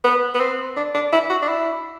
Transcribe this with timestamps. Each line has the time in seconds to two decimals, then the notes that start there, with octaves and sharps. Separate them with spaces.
0.04 B3
0.35 B3
0.40 C4
0.77 D4
0.94 D4
1.13 E4
1.30 F#4
1.42 D4
1.48 E4